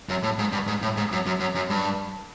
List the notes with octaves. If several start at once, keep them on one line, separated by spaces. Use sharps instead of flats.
F#2
A2
G#2
G2
G#2
A2
G#2
F#2
F#2
F#2
F#2
G2